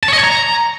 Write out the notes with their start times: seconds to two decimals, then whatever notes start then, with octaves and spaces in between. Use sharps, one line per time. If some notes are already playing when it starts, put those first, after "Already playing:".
0.03 A5
0.08 C#5
0.13 D#5
0.18 C#5
0.23 A#5